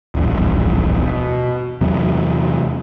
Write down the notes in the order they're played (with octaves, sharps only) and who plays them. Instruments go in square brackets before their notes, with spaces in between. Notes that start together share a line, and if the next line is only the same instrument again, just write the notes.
[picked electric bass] D1 A#1 E2 G2
B2
E2 C3 F#3